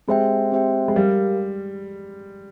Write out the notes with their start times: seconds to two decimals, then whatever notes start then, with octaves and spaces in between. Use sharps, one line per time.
0.08 G#3 C4 G4 C5 E5 G5
0.52 C4 G4 C5 E5 G5
0.88 G#3
0.96 G3 G4 A#4 F5